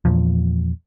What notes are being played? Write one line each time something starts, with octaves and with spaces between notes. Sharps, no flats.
E2 A#2 F3